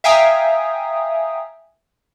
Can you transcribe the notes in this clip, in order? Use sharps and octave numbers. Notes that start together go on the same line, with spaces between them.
E5 F5 G5 G#5 A#5 D#6